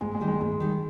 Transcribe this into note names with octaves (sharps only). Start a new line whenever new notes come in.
G#2 G#3
G#3
D#3 G3
G#3
G#2 G#3
D#3 G3